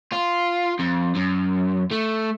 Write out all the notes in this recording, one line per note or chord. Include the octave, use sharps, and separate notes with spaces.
F4
F2
F#2
A3